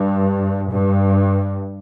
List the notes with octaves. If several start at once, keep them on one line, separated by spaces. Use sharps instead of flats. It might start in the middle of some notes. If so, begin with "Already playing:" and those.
Already playing: G2
G2